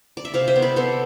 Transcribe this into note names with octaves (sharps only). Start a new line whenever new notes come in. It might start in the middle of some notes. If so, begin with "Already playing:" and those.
D5
E5
C3 D5 F5
C5 E5
B3
B4 D5
B3 A4 C5